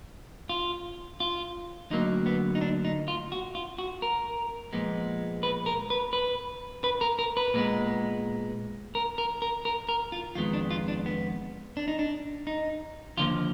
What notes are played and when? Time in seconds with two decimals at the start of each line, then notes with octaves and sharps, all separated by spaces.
0.49 F4
1.20 F4
1.90 D2 D3 F#3 A#3 D#4
2.26 B3
2.55 D#4
2.61 D4
2.85 D#4
3.08 F4
3.32 F#4
3.55 F4
3.78 F#4
4.02 A#4
4.73 A#2 F3 G#3 B3
5.43 B4
5.66 A#4
5.90 B4
6.13 B4
6.84 B4
7.01 A#4
7.19 A#4
7.37 B4
7.54 A#2 G#3 B3
8.95 A#4
9.18 A#4
9.42 A#4
9.65 A#4
9.89 A#4
10.12 F4
10.35 F2 D#3 G#3 B3 F4
10.53 D4
10.71 F4
10.88 D4
11.06 B3
11.77 D4
11.88 D#4
11.99 D4
12.47 D#4
13.17 D#2 D3 F3 A#3 F4